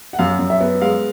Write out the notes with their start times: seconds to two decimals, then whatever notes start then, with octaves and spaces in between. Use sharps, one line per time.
0.13 F#5
0.19 F#2 F5
0.39 F#2
0.50 E5
0.61 B3
0.81 G#3 F5